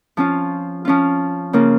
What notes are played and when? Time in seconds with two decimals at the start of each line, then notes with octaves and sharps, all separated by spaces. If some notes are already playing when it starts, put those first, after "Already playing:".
0.17 F3 C#4 F4
0.85 F3 C#4 F4
1.53 C#3 A#3 F4